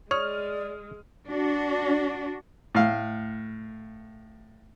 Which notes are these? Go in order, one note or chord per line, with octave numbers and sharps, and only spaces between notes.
G#3 C#5 D5 D#6 F6 F7
D4 F#4
A2 F5